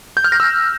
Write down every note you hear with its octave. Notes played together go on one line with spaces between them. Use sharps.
G6
F6
A#6
E6